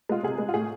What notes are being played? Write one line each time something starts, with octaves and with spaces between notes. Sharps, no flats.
G#3 F4
C3 G#4
G#3
F4
A2 G#4